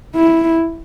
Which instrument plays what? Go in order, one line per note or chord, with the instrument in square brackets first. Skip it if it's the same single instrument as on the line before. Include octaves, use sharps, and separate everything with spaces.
[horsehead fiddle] E4